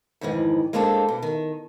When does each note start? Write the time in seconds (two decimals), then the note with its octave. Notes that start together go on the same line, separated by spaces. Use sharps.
0.21 F2 G#2 D#3 E3
0.73 G#3 A#3 C4 D4 E4 A4
1.09 B2
1.23 D#3